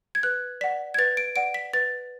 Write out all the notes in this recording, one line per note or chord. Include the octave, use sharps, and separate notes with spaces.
G#6
B4 F#6
D5 F#5 B6
G#6
B4 A6
D7
D5 F#5 D7
B6
B4 A6